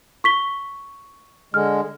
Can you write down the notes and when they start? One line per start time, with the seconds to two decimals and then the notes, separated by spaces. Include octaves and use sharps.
0.24 C#6 B6 G7
1.54 D3 G#3 F6